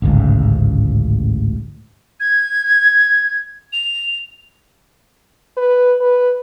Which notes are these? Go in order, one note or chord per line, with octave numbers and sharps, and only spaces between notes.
A1 D2 G#2 C#3
G#6
F7
B4
B4